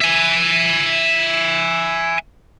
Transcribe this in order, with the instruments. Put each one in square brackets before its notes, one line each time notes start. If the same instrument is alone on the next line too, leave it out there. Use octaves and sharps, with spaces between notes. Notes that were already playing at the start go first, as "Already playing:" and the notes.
[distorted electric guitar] E5 G#5